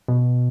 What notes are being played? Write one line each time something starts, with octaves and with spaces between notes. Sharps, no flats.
B2